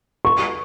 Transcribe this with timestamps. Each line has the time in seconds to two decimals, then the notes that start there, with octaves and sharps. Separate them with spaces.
0.25 C#6